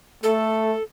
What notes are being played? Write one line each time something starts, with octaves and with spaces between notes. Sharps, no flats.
A3 A4